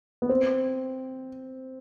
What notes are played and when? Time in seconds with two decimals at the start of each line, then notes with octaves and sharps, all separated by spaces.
0.22 B3
0.29 C4